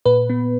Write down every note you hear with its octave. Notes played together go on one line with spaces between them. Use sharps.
A#2 B4
B3